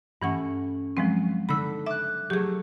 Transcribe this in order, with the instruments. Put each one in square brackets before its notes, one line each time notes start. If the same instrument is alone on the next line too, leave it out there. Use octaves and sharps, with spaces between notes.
[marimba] G2 E3 F#5 [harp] A3 C#4
[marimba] F3 G#3 C4 [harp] F#3 C7
[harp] D3 D#4 B6 [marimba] B5 E6
[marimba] E5 [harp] D6 F#6
[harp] F#3 A3 [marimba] G4 G#4